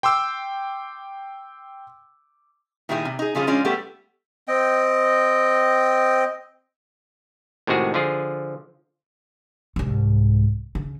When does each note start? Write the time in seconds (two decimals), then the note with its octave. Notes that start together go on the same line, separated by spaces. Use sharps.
0.03 G5 C6 D6 E6
2.89 A#2 D#3 G3 E4 F4 G#4
3.05 C3
3.19 D#4 G#4
3.35 C#3 F3 G3 C#4 F4 G#4
3.47 F3 G#3 C#4 D4 F4
3.65 G3 A3 B3 G4 A4
4.48 C4 D#5 G5
7.67 A2 C3 D#3 G#3 F#4 G#4
7.94 D3 F3 F4 G#4
9.76 C2 G#2
10.75 C#3